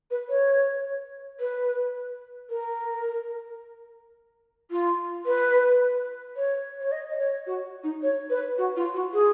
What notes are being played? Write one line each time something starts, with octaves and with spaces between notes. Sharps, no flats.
B4
C#5
B4
A#4
F4
B4
C#5
C#5
D#5
D#5
C#5
F#4
D#4
C#5
B4
F#4
F4
F#4
G#4